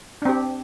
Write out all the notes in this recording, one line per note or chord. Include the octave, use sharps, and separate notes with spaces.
C4 D4 G4